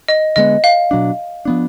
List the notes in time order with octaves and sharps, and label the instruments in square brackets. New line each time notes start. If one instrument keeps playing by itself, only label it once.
[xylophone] D#5
[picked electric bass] D3 G#3 B3 [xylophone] D#5
[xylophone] F5
[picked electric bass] B2 F#3 D4
F3 B3 D4